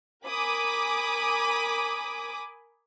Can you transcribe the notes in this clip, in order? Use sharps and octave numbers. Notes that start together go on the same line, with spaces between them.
A#4 G#5 B5 D6 D#6